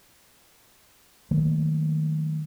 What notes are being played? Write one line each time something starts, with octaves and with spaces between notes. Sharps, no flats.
D#3 F#3 A3 A#3